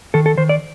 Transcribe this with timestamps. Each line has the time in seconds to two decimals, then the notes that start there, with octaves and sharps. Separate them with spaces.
0.14 D#3 A4
0.26 A4
0.38 D#3 C5
0.49 D5